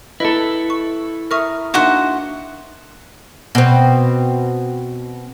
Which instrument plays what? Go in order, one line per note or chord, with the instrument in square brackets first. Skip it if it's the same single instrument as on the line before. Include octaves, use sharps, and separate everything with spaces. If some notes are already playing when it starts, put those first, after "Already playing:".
[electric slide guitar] E4 A4 [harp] B4 [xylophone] D#5
[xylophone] C#6
[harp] A#4 D#6 [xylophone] E5 C#6 F6
[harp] A#3 D4 D#4 [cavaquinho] F#4 C5 F#5 [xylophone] E5 C#6
[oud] B2 C4